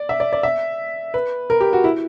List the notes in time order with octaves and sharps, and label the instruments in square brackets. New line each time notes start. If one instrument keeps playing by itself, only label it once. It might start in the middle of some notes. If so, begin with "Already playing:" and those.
Already playing: [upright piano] D5
E5
D5
D5
E5
B4
A#4
G4
F#4
E4